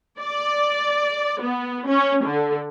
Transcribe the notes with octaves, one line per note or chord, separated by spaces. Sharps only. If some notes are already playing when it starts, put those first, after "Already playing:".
D5
B3
C#4
D3